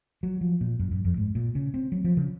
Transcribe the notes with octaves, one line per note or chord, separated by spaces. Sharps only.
F#3
F3
A#2
F#2
F#2
F2
G#2
A#2
C#3
C4
F#3
F3
C#3